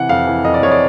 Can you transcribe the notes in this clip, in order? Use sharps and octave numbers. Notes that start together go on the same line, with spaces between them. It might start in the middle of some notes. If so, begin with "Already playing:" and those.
Already playing: C3 E3 F#5
F2 F5
E3
F2 D#5
D5
F2 C#5
D5